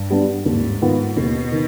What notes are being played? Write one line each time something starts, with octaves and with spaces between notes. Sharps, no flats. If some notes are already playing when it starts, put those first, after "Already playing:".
Already playing: G2
G3 B3 D4
D#2 G#2
D#3 B3 F4
D#2 B2
D#3